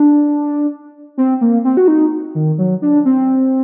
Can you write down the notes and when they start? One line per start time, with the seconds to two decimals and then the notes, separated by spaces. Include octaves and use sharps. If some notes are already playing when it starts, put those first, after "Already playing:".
Already playing: D4
1.18 C4
1.41 A#3
1.65 C4
1.77 F#4
1.88 D#4
2.35 D#3
2.58 F#3
2.82 D4
3.05 C4